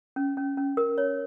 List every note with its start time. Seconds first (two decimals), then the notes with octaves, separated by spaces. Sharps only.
0.16 C#4
0.37 C#4
0.57 C#4
0.77 A#4
0.98 C#5